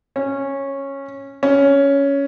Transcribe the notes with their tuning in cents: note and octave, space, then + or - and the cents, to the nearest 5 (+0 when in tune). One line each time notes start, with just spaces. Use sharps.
C#4 -10
C#4 +10